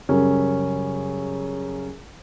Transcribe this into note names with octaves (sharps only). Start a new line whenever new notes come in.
F#2 C#3 G3 C#4